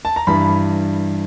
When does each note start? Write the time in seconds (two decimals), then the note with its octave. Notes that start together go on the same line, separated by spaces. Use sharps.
0.05 A5
0.16 A#5
0.27 G2 E3 G3 B5